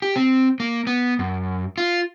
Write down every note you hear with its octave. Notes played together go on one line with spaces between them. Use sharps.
G4
C4
A#3
B3
F#2
F4